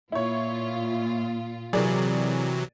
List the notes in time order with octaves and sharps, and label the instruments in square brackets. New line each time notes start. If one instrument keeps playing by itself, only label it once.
[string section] A#2 F4 [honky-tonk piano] E4 C#5
[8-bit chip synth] C3 E3 F#3 [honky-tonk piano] G#4 A#4 D5